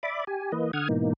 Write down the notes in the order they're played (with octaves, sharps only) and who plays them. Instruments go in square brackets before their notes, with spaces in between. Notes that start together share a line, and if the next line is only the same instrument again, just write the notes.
[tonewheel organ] D5 E5 B5 D6
G4 G#5
E3 A#3 B4 D#5
D3 F#5 D#6 F6 G#6
G#2 B2 E3 A#3 D#4